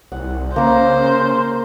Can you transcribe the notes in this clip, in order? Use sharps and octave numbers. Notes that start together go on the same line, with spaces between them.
C2 F#5
C#3 A#3 A#4 C5